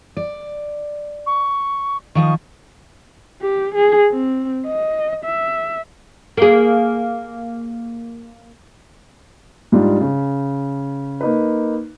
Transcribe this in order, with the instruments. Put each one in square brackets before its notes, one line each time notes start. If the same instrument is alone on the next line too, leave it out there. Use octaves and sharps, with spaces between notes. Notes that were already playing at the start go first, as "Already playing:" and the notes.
[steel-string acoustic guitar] D5
[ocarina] C#6
[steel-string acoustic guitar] D#3 F3 D#5 [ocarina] C#6
[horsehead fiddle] G4
G#4
C4
D#5
E5
[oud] A#3 G#4
[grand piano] G#2 G3 D4 F4
C#3
A#3 D#4 B4